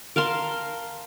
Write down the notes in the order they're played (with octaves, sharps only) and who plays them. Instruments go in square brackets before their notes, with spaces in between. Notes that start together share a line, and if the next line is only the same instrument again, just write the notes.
[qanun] A#4 F5 A5 C6